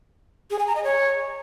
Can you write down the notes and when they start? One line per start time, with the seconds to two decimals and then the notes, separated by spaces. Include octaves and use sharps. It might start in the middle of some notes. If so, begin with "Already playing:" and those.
0.50 G#4
0.59 G#5
0.67 A#5
0.75 D#5
0.84 C#5